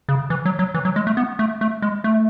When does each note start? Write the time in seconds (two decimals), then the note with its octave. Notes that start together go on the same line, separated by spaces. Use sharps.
0.09 C#3
0.30 E3
0.45 F#3
0.59 F#3
0.74 E3
0.85 F#3
0.96 G#3
1.07 A3
1.17 B3
1.39 A3
1.61 A3
1.82 G#3
2.04 A3